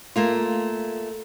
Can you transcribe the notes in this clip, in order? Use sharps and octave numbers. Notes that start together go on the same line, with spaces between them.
A3 A#3 F4